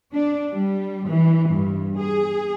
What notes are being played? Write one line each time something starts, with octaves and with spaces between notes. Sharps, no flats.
D4
G3
E3
G2
G#4